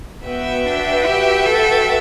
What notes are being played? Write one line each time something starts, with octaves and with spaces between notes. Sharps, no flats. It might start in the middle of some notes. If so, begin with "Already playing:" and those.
B3 F#4 B4 E5 G5
D4
G4
A4